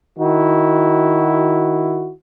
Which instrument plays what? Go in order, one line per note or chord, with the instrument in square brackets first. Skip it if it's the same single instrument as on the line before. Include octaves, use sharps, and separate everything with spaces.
[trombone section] D#3 E4 F#4